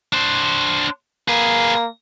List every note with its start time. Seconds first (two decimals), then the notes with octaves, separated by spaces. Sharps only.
0.13 D4 C5
1.28 A#3 G#4 B4